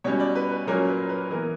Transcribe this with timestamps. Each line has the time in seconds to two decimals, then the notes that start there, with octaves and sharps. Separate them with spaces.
0.04 B2 G3 C#4 C#5
0.20 D5
0.35 B4
0.52 B4
0.67 A#2 F#3 A#3 C#4 A#4
0.89 B4
1.09 B4
1.30 E3 B3 A#4